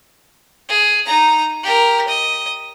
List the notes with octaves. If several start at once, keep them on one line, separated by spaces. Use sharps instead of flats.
G#4
D#4 A#5
G4 A#4
D#5